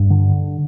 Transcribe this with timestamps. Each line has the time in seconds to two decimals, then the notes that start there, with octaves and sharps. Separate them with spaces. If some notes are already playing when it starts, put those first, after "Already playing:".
Already playing: G2 D4
0.10 D3